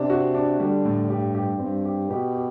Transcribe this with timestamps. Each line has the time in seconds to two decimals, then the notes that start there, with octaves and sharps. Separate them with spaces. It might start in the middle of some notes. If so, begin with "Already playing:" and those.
Already playing: C3 D4
0.10 F#4
0.34 D4
0.60 D3 G3
0.85 A2
1.10 G2 G4
1.35 G4
1.59 G2 C4
1.85 G4
2.10 B2 G4
2.35 G4